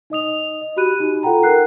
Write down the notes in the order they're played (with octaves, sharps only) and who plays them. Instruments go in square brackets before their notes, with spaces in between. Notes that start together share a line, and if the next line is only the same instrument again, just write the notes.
[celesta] D#4 D#5 D#6 F7
D#5
F#4 G4 B5 F#6 D#7
D#4 G4
F4 A4 F#5 G5 A#5
D#4 A#4 F#5 F#6 C7